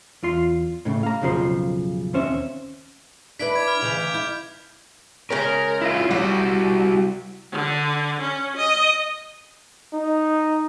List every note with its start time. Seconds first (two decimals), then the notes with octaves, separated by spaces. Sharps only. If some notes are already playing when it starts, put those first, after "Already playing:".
0.23 E2 F4 C6
0.85 A2 C#3 A3
1.03 F5 A#5
1.21 B1 F2 C#3 F3 G#4 C5
2.13 D#2 C4 C#4 C5 E5
3.39 D4 E4 B4 B6 D7
3.55 D6 G#6
3.68 F6
3.81 D2 C#3 E3 G6 F7
4.14 E4 G6
5.30 C#3 G#3 C#4 A#4
5.81 E4 F4
6.11 G3 E4 F#4
7.52 D3
8.20 C#4
8.57 D#5
9.93 D#4